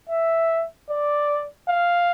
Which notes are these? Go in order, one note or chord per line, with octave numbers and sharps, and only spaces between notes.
E5
D5
F5